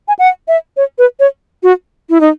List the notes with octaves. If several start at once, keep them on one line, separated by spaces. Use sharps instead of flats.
G#5
F#5
E5
C#5
B4
C#5
F#4
E4
D#4